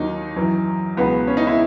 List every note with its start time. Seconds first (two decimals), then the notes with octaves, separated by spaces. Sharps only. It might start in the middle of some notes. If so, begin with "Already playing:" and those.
Already playing: D#2 D#3 F#3 D#4
0.36 F#2 E3
0.97 C#2 B2 F#3 B3
1.27 C#4
1.37 D#4
1.47 E4